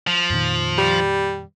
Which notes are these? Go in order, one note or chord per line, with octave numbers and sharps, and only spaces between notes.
F3
F2 A#2 D#3
G3